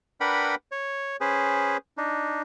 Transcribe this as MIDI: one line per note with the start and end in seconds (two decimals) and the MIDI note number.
0.21 0.55 62
0.21 0.55 70
0.21 0.55 71
0.21 0.55 78
0.21 0.55 79
0.21 0.55 83
0.72 1.17 73
1.21 1.77 61
1.21 1.77 68
1.21 1.77 71
1.21 1.77 72
1.97 2.42 62
1.97 2.42 63